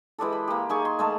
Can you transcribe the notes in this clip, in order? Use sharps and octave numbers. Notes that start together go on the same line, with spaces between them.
E3 G#3 G4 A4
B5
A#3 G4
D#3 G#4 G#5 C#6
C6
G#3 A3 A5